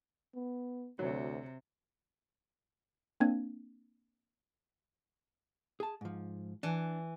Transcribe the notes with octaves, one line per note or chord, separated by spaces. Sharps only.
B3
D2 C3 F#3
A#3 C4 D4 G#6
G#4 A5
G#2 F3
E3 D4